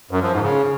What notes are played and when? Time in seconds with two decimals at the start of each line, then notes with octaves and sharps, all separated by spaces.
0.11 F#2
0.22 F3
0.32 G#2
0.43 C#3